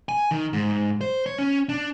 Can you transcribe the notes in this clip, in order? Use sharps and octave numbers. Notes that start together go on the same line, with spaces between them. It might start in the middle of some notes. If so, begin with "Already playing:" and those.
G#5
D#3
G#2
C5
C#5
C#4
D4